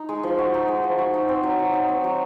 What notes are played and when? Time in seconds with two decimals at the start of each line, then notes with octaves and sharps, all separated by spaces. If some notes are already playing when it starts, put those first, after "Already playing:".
Already playing: D#4
0.09 G#3
0.23 F3
0.38 F#4
0.54 D#4
0.68 G#3
0.84 F3
0.98 F#4
1.14 D#4
1.29 C4
1.43 F#3
1.59 F#3
1.73 D#4
1.89 C4
2.04 F#3